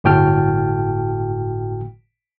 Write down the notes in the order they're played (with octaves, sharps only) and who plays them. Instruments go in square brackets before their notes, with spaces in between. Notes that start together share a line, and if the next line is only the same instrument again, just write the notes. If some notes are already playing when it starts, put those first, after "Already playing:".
[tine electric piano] G1 A2 F#4 G5 A5 F6